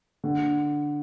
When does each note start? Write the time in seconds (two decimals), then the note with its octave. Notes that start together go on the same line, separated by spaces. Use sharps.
0.24 D3